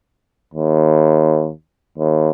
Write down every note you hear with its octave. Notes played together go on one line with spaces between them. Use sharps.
D#2
D#2